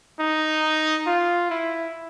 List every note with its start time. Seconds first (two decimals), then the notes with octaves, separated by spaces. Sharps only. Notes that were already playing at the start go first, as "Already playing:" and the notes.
0.20 D#4
1.07 F4
1.50 E4